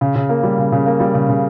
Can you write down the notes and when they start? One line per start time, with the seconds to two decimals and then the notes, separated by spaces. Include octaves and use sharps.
0.01 C#3
0.15 C#3
0.29 A#3
0.43 G3
0.58 C#3
0.72 C#3
0.86 A#3
1.00 G3
1.14 C#3
1.29 C#3